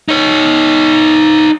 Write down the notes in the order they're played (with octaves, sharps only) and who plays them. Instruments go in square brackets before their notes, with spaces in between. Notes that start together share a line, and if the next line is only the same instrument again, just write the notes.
[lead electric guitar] D#4 C#5